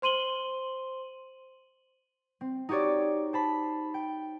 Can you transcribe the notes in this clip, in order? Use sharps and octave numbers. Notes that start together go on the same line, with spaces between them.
C5 C6 D#7 F#7 G7
C4
D#4 F#4 G4 C#5 D5
C5 A5 B5
G5